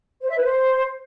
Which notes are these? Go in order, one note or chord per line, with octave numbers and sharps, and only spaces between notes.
C5
E5
B4
C5